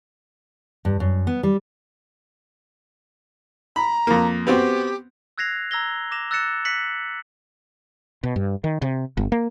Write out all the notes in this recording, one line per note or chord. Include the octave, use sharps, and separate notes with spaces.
G2
F#2
B3
G3
A#5 B5
F2 A#3
B3 C4 F#4 G4
E6 F#6 G#6 A#6 C7 F7
A#5 E6 G#6 A#6 G7
D6 A#6 E7 F7
E6 F#6 A6 A#6 C#7 E7
F#6 A#6 B6 C#7 F#7
B2
G2
D#3
C3
G1
A#3